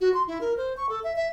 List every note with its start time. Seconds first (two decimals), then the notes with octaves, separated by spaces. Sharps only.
0.01 F#4
0.14 C6
0.27 E4
0.41 A#4
0.57 C5
0.77 C#6
0.89 A4
1.04 E5
1.16 E5